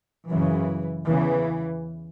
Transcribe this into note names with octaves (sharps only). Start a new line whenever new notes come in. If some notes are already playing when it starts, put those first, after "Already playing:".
F#2 C#3 E3
E2 C#3 E3